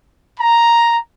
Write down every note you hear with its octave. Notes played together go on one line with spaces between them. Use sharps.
A#5